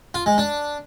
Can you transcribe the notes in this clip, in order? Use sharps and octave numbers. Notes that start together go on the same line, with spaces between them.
F4
G#3
D4